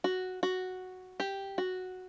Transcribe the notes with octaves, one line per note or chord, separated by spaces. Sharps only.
F#4
F#4
G4
F#4